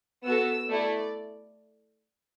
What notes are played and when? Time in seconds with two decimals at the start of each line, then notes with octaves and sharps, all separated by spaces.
0.24 B3 F#4 A4 E6
0.69 A3 E4 A4 D5